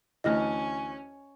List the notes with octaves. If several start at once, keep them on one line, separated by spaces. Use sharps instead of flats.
D2 E3 C#4 D#5 F6 A#6